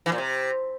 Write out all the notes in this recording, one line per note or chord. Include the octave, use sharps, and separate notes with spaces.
E3
A#2
C3